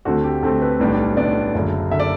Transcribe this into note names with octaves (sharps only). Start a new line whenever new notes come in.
D2 D3 A3 C4 F#4
G4
D2 D3 A3 C4 A4
B4
B1 A2 G3 B3 D4
B1 A2 G3 B3 D4 D5
F#1 F#2 D3
D3 E5
D5